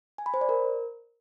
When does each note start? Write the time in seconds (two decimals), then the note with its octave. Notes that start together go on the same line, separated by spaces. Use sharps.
0.18 G#5
0.26 B5
0.34 C5
0.41 D5
0.49 A#4